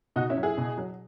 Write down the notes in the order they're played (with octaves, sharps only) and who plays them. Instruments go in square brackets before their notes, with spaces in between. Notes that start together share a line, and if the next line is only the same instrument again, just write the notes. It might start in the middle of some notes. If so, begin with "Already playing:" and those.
[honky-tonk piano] B2 D#4 F#4
C#4 E4
F#3
E4 G#4
B2
F#3